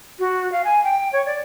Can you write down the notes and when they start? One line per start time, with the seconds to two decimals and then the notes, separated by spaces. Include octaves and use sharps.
0.19 F#4
0.52 F5
0.64 G#5
0.84 G5
1.13 C#5
1.26 D5